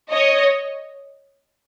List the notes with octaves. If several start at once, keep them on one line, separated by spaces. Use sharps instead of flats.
C#5 D#5